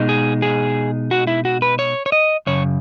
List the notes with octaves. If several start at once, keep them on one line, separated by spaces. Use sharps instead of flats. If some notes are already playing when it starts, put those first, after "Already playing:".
Already playing: B2 G#3 D#4
G#4
G#4
F#4
E4
F#4
B4
C#5
C#5
D#5
F#2 C#3 C#5